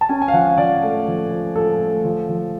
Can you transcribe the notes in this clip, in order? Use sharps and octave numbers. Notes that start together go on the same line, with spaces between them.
A5
C#4 G#5
G#5
F5
F3 F#5
F5
F3 D5
A3
F3
F3
F3 A4
A3
F3
F3